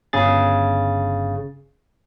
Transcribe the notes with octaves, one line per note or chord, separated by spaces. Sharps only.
G1 C#3 G#4 A6